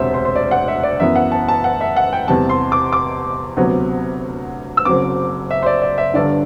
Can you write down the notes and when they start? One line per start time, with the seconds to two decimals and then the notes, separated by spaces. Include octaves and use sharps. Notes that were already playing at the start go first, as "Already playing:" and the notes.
Already playing: E1 D2 C3 C5 E5
0.14 C5
0.25 C5
0.36 D5
0.51 F#5
0.68 E5
0.83 D5
1.00 F#2 E3 B3 E5
1.15 F#5
1.32 A5
1.48 A5
1.64 F#5
1.81 E5
1.97 F#5
2.13 G5
2.28 E2 C3 G3 A5
2.49 C6
2.72 D6
2.93 D6
3.57 D2 C3 F#3 B3
4.77 E6
4.85 F#1 F#2 F#3 C4 D6
5.51 E5
5.63 C5
5.66 D5
5.82 D5
5.98 E5
6.14 G1 G2 D3 D5